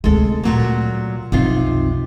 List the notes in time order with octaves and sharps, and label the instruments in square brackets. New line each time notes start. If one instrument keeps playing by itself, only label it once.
[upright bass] D2 C3 [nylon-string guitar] G#3 A4
[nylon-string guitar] A#2 F#3 A#3
[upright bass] B1 F2 [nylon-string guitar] C3 D#4 F4